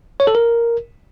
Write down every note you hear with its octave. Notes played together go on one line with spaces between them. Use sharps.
C#5
A4
A#4